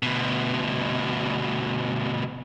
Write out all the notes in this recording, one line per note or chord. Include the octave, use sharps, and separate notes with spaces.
D2 B2